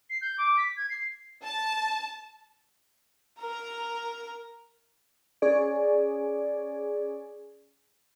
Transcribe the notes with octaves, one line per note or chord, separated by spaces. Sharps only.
C7
G6
D6
B6
G#6
C7
A5
A#4 A#5
C#4 G#4 D5